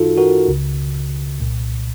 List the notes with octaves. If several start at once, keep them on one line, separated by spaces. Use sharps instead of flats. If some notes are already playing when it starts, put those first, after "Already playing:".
Already playing: F#2 D#3 D#4 F4 F#4 A4
F#4 A#4
C#2 C#3
C2 A#2